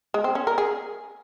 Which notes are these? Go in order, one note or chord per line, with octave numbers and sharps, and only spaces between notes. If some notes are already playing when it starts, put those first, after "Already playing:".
G#3
C4
C#4
A#4
G#4